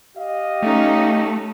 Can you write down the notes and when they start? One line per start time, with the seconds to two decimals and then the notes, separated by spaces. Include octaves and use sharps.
0.18 G4 D#5 F5
0.63 A3 C#4 D#4